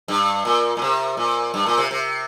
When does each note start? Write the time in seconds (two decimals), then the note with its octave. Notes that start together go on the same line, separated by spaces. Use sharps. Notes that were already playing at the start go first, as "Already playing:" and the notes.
0.08 G2
0.45 A#2
0.77 A#2
0.82 C3
1.17 A#2
1.54 G2
1.66 A#2
1.78 C3
1.91 C3